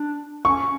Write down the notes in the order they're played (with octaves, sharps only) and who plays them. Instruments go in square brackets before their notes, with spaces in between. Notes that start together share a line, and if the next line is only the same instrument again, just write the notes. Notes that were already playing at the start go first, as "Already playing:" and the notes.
Already playing: [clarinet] D4
[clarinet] C#4 [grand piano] C#6